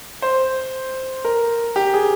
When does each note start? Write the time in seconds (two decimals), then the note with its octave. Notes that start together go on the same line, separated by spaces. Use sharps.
0.22 C5
1.25 A#4
1.76 G4
1.94 G#4